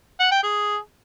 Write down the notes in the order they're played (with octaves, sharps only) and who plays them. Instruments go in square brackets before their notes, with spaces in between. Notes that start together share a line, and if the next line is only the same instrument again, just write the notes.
[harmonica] F#5
G5
G#4